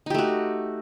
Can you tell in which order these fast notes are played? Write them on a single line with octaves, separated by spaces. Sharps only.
D#4 G4 A3 F#4